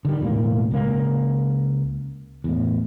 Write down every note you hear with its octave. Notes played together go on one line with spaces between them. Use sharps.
D3 D#3 G3
E1 A2 G#3 A#3
C#2 A#3
E2 A2